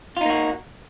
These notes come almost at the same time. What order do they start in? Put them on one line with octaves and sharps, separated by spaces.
F4 D#4 A#3 F#4